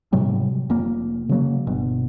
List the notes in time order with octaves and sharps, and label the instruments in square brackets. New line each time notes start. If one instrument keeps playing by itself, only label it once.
[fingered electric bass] G#2 C3 F#3 G3
F1 A#3
C#3 F#3 A#3
G1 B2